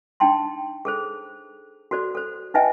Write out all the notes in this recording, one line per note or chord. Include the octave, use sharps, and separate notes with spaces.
D4 D#4 G5 A5 C6
G#4 A4 C5
F#4 A4 C5 D5
A4 C5
D#4 B4 D#5 E5 G5 G#5